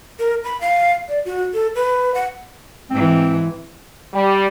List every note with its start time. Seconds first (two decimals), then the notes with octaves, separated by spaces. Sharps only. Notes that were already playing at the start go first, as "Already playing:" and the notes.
0.19 A#4
0.44 B5
0.61 F5
1.08 D5
1.25 F#4
1.54 A4
1.75 B4
2.15 F#5
2.90 G#2 E3 C4
4.13 G3